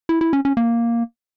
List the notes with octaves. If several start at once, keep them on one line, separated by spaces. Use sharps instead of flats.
E4
E4
C#4
C#4
A#3